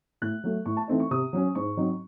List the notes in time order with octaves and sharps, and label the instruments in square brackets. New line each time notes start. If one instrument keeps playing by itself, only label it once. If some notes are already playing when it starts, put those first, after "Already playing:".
[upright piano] A2 F#6
F#3 A3
A2 C#6
A5
E3 A3 C4 D#4
C#6
C3 D#6
F#3 C#4
G#2 C#6
F#3 C4 D#4